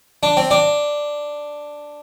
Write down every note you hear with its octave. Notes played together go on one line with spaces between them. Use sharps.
D4
C4
D4